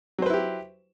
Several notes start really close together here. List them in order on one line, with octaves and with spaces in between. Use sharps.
F#3 C5 B4 E4 G4